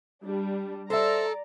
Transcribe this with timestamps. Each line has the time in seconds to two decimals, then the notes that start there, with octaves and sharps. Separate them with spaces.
0.23 G3 D4
0.90 A4 C5 D5 E5 A#5